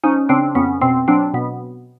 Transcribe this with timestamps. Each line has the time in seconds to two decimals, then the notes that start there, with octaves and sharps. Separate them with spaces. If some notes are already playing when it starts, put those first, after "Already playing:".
0.04 F3 C#4 D#4
0.29 C#3 C4 D4
0.55 F2 B3 C#4
0.81 B2 C4
1.08 F#3 C4 D4
1.34 B2 B3